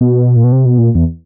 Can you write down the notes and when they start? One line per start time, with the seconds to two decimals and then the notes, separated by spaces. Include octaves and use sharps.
0.01 B2
0.36 A#2
0.44 B2
0.52 C3
0.65 B2
0.78 A#2
0.95 E2